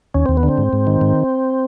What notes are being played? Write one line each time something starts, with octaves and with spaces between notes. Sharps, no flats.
D#2 C#4
D#2 C4
B3
D3
C4
G#2
G#2
D#3
G#2